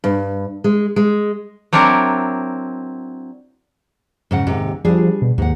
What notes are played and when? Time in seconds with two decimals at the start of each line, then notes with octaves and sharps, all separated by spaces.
0.04 G2
0.64 G#3
0.96 G#3
1.73 F#3 C4 D4 E4 A#4
4.31 G#2 C#3 F#5
4.47 D#2 G#2 C3
4.85 F3 G3 D4 G#4
5.22 B2
5.38 D#2 G#2 F#5